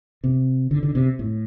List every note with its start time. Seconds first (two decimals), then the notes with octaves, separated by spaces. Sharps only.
0.24 C3
0.71 D3
0.83 D3
0.95 C3
1.19 A2